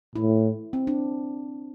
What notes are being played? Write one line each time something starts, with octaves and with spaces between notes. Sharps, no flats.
A2 E4
C4
D4